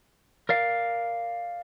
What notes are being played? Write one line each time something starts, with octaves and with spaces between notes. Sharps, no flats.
A#4 D5 F5